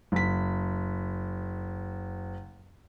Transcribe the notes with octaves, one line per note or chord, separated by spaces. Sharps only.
F#1 B6